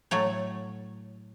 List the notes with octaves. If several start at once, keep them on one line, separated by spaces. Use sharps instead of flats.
A2 F#3 A3 C#5